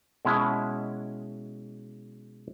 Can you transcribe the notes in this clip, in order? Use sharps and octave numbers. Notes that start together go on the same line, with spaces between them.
B2 G#3 C#4 E4